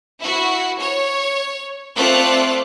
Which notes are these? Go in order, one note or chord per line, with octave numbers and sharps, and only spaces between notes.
E4 F#4
C#5
A3 C4 F4 D5 F#6